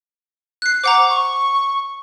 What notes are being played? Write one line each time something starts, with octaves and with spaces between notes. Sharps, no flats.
F#6 C7
C5 F#5 A#5 D6
C#6